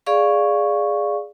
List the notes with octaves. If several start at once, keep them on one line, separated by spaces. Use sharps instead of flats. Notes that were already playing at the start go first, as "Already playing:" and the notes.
G#4 D5 F5 C#6